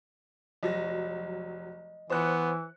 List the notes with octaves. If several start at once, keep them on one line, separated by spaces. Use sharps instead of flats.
F1 F#3 D#5 A#6
E3 B3 C5 F#6 C#7